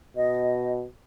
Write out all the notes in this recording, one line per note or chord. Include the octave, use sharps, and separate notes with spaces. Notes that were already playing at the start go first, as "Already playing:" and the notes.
B2 D#5